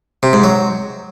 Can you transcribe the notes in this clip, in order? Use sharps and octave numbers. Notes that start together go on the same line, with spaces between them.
C3
G#2
F#3